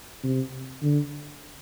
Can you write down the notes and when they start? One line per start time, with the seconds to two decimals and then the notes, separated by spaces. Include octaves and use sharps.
0.23 C3
0.82 D3